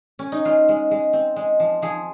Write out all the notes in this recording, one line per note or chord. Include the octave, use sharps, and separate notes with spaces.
C#4
D#4
G#3 F4
G#3
G#3
C4
G#3
F3
F3 G#4